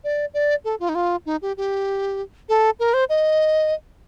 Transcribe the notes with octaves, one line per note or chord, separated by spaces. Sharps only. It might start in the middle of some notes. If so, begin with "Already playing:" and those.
D5
D5
A4
F4
D#4
F4
D#4
G4
G4
A4
A#4
C5
D#5